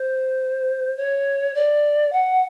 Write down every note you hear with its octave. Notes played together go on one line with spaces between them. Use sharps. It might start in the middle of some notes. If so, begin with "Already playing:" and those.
Already playing: C5
C#5
D5
F#5